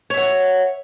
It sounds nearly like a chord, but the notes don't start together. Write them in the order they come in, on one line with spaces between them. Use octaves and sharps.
C#5 E5 F#5